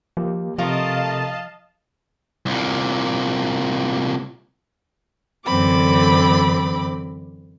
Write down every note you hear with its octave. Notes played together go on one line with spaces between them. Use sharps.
F3 A#3 G4
C3 F3 A3 A#3 F4 D#5 F5 A5
C2 A#2
F#2 D3 E3 C4 B5 D6